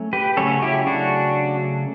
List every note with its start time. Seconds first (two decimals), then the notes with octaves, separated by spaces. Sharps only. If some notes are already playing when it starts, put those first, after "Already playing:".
Already playing: F#3 A3 C#4
0.13 G4 B4
0.37 C#3 F#3 A3 C#4 A4 C#5
0.62 E4 G4
0.87 D4 F#4